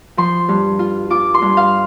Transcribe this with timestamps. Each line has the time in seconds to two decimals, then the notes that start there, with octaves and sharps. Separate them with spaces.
0.17 F3 C6
0.48 G2
0.79 F4
1.10 F4 D6
1.34 C6
1.42 G2
1.57 F5